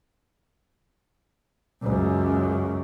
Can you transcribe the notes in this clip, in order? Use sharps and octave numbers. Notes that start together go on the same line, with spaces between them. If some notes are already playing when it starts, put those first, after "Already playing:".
C#2 F#2